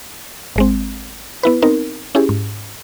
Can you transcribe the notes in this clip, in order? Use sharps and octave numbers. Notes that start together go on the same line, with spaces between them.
G#1 G#3 C4
B3 E4 B4
B3 C4 D#4 A#4
C#4 E4 G4 G#4
G#2